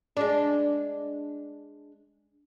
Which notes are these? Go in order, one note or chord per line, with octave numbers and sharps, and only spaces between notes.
G#3 D4